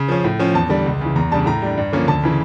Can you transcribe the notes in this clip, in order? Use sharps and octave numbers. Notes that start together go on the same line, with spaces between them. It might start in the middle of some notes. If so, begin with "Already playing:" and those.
Already playing: C#3
F3 C#4
A2
F3 C#4
E2 A5
D3 G3
C#2
C#3 E3
E2 A#5
C#3 G3 D4 A5
A2 A#5
G3 D4
G2
D3 F3 A#3 C#4
D2 A5
C#3 E3